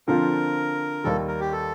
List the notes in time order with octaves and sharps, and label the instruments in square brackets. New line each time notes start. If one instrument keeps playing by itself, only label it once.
[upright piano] D3 F3 C4 F4 [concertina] A#4
[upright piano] D#2 D#3 G3 [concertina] A4
[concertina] A#4
G4
A4